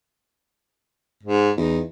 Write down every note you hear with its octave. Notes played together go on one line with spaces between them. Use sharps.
G#2
E2 D#4